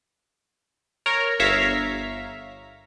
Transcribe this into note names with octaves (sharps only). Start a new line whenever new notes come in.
A#4 C#5
G1 C#5 E5 F5 A#5 B6